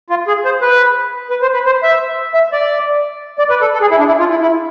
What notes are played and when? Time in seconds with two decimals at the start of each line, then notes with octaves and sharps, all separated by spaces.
0.10 F4
0.28 G#4
0.45 C5
0.61 B4
1.30 B4
1.42 C5
1.54 B4
1.66 C5
1.83 E5
2.34 E5
2.52 D5
3.38 D5
3.50 B4
3.61 A4
3.73 A4
3.81 G#4
3.91 E4
3.99 D4
4.07 E4
4.20 F4
4.30 E4
4.42 E4